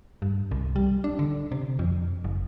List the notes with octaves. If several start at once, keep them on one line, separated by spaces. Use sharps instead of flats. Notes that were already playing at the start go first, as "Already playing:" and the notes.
G2
C2
G3
D4
D3
C3
F2
F#1